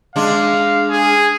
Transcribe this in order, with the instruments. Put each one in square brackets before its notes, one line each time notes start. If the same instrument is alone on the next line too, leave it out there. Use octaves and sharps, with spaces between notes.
[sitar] G#3 D4 [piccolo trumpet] F5
[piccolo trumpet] G#4